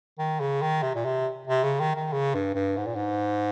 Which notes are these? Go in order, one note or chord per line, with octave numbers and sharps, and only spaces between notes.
D#3
C#3
D#3
C3
A#2
C3
C3
C#3
D#3
D#3
C#3
G2
G2
G#2
A#2
G#2